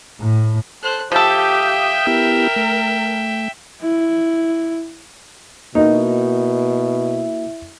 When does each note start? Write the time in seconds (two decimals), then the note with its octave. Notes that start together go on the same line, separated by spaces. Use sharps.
0.19 A2
0.83 A4 C5 F#6
1.12 F3 G4 A4 E5 F5 G5 D#6 G6
2.07 B3 E4 G4 A#4
2.56 A3
3.81 E4
5.75 B2 A#3 D#4 E4 F#4 A#4